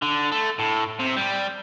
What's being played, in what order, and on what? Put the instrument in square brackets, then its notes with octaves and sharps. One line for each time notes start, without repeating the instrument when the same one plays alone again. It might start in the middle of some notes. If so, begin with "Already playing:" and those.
[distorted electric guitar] D3
A3
A2
C3
G3